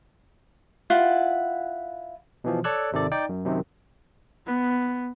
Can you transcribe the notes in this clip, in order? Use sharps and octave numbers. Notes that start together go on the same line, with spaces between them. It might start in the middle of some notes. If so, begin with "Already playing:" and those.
E4 F4 F#5
B2 E3 F3
A4 C#5 D5 C#6 E6 F#6
G#1 C3 D#3 A4 D5
D#4 D5 G5
F#2
F#2 C3 D#3
B3